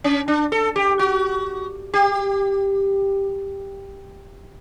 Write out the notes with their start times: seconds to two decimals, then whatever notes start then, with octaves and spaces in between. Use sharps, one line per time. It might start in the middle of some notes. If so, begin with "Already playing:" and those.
0.04 C#4
0.28 D4
0.52 A4
0.76 G4
0.99 F#4
1.94 G4